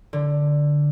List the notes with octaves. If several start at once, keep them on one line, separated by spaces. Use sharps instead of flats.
D3